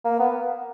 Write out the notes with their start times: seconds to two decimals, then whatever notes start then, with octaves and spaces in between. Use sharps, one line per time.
0.05 A#3
0.19 B3